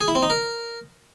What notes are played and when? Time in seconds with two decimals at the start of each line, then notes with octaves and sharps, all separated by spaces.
0.01 G#4
0.08 E4
0.15 C4
0.23 D#4
0.30 A#4